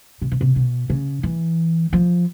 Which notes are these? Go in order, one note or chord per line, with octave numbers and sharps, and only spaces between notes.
C3
B2
C3
B2
C#3
E3
F3